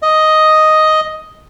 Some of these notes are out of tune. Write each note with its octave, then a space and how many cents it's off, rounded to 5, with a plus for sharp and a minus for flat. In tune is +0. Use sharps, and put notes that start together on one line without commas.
D#5 +5